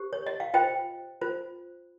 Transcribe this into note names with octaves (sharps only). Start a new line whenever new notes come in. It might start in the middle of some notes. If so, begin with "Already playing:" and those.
Already playing: G4 C5
C#5
D#5
F5
F4 C5 D#5 G5
F4 C5